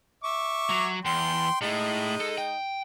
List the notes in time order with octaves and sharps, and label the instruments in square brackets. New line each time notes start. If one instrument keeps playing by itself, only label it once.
[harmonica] E5 C#6 D6
[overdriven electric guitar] F#3
[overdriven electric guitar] E2 [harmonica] G5 C6
[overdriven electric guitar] A2 [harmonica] G#3 D#4
[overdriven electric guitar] A4
G5